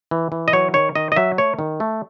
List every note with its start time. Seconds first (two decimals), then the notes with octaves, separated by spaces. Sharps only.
0.11 E3
0.32 E3
0.48 D#5
0.53 F#3 C#5
0.74 D#3 C#5
0.95 D#3 D#5
1.12 D#5
1.16 F#3 E5
1.38 A3 C#5
1.59 D#3
1.80 A3